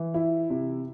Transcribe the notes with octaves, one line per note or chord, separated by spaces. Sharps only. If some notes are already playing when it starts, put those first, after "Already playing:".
Already playing: E3
E4
C3